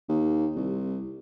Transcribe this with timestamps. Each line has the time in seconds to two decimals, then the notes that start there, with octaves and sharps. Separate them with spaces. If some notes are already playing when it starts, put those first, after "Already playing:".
0.09 D#2
0.56 C2